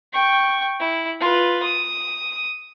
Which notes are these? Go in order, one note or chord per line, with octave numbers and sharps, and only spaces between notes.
G5 C#6
E4
F4 B4
D#6